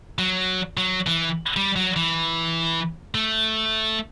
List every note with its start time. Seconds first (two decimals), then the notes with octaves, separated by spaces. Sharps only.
0.19 F#3
0.77 F#3
1.07 E3
1.56 G3
1.76 F#3
1.96 E3
3.15 A3